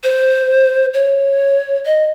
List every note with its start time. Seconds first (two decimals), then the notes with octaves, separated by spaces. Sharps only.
0.04 C5
0.94 C#5
1.86 D#5